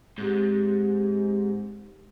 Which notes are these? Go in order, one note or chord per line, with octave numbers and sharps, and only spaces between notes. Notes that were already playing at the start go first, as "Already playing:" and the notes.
G#2 C4 G4